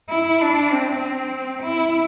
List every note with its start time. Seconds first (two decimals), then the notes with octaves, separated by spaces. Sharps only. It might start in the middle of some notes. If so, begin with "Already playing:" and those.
0.10 E4
0.41 D4
0.72 C4
1.63 E4